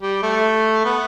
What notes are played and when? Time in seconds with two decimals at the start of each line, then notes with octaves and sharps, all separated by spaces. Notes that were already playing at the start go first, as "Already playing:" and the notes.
0.02 G3
0.22 A3
0.85 B3